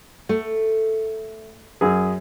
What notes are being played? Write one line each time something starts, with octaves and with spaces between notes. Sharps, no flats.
A3
F#2 G#4